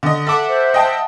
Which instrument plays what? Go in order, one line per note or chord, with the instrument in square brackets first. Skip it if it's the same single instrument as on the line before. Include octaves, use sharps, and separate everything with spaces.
[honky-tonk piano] D3 D#5
[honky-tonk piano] A4 D6 [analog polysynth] E5 F#5
[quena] C5
[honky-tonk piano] D#5 G5 A5